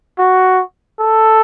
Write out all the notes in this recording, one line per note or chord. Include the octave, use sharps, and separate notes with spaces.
F#4
A4